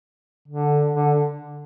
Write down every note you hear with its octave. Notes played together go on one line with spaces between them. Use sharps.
D3
D3